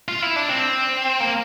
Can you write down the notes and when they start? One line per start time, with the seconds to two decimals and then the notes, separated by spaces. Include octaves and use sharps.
0.08 F4
0.22 E4
0.36 D4
0.49 C4
1.20 A#3